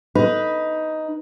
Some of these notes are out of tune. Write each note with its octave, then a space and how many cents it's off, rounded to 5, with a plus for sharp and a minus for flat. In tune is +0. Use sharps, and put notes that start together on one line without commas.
D#4 +10 B4 -5